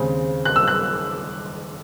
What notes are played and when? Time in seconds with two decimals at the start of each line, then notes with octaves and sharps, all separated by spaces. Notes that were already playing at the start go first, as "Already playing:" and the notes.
Already playing: D#2 C#3 G#3 C4
0.45 F#6
0.56 E6
0.68 F#6